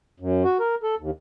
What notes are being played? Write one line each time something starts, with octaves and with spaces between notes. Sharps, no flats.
F#2
F#4
A#4
A4
D#2